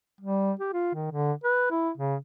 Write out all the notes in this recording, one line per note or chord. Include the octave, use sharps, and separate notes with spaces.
G3
G4
F4
D#3
D3
B4
E4
C#3